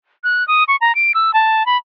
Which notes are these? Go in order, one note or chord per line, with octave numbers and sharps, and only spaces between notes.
F#6
D#6
C#6
A#5
D7
E6
A5
B5